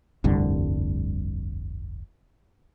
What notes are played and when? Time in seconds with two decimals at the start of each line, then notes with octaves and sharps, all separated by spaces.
0.24 F1 C2 G2 D3